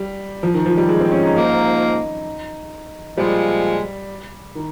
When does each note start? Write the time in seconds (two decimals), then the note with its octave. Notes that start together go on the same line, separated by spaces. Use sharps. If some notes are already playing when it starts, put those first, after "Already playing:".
Already playing: G3
0.43 F3
0.54 D#3
0.66 F3
0.78 G3
0.89 G#3
1.00 C4
1.12 C#4
1.23 D#4
1.34 G#2 F3 A#3 D#4
3.17 A#2 F3 G3 G#3
4.55 D#3